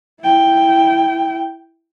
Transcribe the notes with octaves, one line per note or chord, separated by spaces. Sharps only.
E4 G5